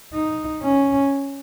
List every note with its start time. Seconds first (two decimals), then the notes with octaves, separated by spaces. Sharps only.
0.14 D#4
0.63 C#4